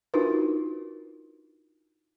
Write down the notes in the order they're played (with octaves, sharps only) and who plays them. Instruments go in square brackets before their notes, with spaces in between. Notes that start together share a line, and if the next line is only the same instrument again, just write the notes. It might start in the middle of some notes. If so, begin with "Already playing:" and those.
[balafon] D4 D#4 F4 F#4 A#4 B4